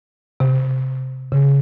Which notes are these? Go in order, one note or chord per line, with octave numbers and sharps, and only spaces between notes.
C3
C#3